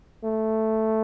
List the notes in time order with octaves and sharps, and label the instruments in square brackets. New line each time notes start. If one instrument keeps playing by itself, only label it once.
[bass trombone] A3